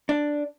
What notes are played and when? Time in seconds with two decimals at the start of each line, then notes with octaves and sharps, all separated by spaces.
0.09 D4